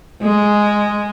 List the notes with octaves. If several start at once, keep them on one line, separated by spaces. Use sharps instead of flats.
G#3